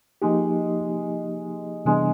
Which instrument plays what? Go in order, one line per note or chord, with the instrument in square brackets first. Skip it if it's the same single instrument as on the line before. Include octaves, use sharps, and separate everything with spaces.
[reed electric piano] F3 A#3 D#4 G4 [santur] G#3
[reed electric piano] C3 E3 G3 B3 D4 [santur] G#3